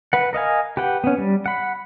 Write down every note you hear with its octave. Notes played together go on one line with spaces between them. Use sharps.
B4 F#5
A#4 D#5 F5 G#5
G4 B4 F#5 G5
B3 C#4
G3
F#5 B5